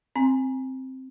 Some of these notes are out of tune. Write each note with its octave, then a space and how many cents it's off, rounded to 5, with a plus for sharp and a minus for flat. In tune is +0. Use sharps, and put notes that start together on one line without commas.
C4 +0 G#5 +0 C6 +0